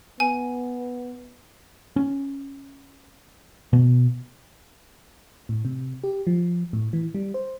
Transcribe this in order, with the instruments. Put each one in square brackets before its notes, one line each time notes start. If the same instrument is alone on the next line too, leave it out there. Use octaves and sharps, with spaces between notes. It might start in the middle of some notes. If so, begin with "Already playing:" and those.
[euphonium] B3 [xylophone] G#5
[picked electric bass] C#4
B2
[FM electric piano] A2
C3
G4
F3
A2
E3
G3
C5